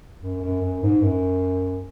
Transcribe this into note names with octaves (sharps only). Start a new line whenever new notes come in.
F#2
F#2
F#2
G#2
F#2